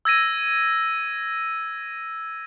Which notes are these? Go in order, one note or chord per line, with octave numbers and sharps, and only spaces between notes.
E6 G#6 A#6 D#7